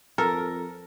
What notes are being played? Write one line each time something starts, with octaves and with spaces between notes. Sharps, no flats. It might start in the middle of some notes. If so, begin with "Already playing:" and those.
F2 A4 A#4